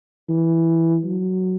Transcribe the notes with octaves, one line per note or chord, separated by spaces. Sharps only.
E3
F#3